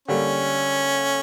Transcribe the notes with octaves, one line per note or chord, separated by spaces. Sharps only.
D3 G3 A#3 C#4